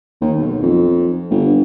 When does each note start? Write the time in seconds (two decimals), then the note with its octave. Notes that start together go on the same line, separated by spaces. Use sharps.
0.21 D#2
0.38 B1
0.62 F2
1.30 G1